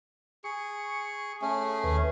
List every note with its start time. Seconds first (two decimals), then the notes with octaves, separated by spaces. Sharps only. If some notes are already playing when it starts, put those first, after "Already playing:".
0.44 G#4 C#6
1.42 A3 C#4 G#4
1.84 D#2 B4